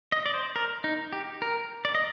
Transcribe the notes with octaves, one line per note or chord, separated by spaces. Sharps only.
D#5
D5
C5
A#4
D#4
G4
A#4
D5
D#5